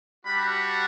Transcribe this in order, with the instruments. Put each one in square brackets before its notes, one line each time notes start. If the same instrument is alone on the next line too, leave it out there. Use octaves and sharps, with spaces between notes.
[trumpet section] G3 D4 F#4 B5